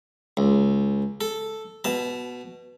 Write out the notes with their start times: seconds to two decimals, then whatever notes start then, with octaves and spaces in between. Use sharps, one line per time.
0.37 C#2
1.21 A4
1.84 B2 A5